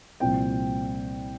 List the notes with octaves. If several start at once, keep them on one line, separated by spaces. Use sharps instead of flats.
C2 A#2 F3 C4 G5